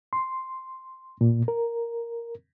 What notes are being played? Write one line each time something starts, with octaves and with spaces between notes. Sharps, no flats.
C6
A#2
A#4